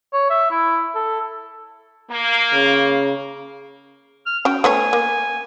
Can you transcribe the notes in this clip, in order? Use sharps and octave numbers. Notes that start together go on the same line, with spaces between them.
C#5
E5
E4
A4
A#3
C#3
F6
C#4 F#4 G5
A3 B3 C#5 G#5
A#3